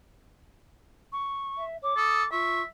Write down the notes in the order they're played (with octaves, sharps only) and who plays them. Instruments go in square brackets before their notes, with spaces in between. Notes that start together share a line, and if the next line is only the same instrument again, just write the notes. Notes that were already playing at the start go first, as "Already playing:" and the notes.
[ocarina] C#6
[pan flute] E5
[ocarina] C#5 [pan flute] D6
[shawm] A4 [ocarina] D#6
[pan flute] F4 [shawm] E5 [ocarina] C#6